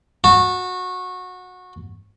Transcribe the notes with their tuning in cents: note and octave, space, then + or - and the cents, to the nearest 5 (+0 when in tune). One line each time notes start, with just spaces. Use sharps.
F#4 -20 A5 +0